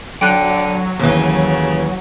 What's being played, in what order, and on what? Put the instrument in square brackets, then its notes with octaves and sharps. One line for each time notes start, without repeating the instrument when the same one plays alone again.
[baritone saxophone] D3 [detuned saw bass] F#3 [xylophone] G5 F#6
[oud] D#2 E3 [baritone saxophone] C#3